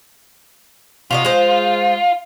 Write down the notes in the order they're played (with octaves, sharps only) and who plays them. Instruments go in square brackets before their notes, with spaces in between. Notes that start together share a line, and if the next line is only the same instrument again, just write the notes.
[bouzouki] C3 F#4 D#5 [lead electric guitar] F4
[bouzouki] G#3 C5